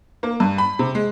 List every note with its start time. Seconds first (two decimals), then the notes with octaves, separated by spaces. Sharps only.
0.23 A#3
0.40 G2
0.58 B5
0.79 C3
0.95 G#3